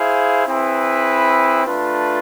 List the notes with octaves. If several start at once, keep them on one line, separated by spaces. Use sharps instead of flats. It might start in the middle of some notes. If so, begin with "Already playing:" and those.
Already playing: E4 G#4 C5 F5
C4 E4 G#4 B4
A3 D4 F4 B4